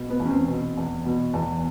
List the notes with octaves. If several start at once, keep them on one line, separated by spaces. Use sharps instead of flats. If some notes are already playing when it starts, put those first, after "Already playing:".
Already playing: B2
B3
E2
C#4
C4
B2
E2
B2
E2